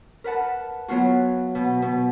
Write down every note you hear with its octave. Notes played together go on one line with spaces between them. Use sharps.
A#4 B4 F#5 A5
F#3 B3 F4 F#4
B2
B2